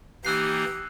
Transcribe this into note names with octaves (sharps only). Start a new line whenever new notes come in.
E3 A#3 D#4 G4 E6 F#6 C7